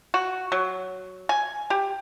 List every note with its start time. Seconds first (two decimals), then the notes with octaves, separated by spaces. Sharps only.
0.14 F#4
0.52 F#3
1.29 G#5
1.70 G4